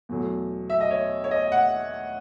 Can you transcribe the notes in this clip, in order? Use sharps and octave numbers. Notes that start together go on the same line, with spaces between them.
E2 B2 F#3 A3
E5
D#5
C#5
C#5
D#5
F#5